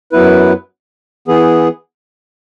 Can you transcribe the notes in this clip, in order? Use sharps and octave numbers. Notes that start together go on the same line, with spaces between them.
F#2 F#3 B3 E4 B4
E3 B3 G#4